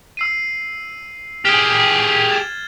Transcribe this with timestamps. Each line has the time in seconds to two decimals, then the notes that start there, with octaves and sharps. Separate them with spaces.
0.17 E6 C7 D#7
1.45 G4 G#4 F6 E7 G7
2.30 G#6 A6 E7